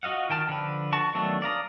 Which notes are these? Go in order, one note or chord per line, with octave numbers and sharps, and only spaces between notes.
F4 F#4 D#5 F5 F#5
D#3 G5 A5 F6
D3 F3 B4
F#4 A5 C#6
D#3 F#3 A3 B3 D4
D5 F5 A#5 D#6